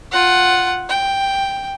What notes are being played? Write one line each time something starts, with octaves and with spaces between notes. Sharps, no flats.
F4 F#5
G5